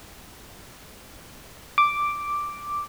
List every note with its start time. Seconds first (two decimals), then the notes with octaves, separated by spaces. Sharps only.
1.78 D6